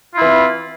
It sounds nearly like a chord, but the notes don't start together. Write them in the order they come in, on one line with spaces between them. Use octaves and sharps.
F4 E4 E3 C4